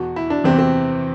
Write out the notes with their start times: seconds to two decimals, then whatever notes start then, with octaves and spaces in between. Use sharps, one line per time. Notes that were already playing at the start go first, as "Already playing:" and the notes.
Already playing: E2 B2 F#4
0.16 E4
0.30 D4
0.44 E2 C3 E3 C4
0.59 C4